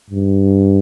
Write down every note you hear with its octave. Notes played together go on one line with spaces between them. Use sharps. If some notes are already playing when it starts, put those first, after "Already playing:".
G2